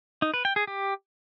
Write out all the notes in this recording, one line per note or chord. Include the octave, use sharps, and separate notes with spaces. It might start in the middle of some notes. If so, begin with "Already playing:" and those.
D#4
B4
G5
G#4
G4